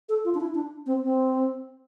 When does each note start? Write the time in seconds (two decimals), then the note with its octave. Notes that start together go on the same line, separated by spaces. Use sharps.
0.09 A4
0.25 F4
0.34 D4
0.40 E4
0.55 D4
0.86 C4
1.02 C4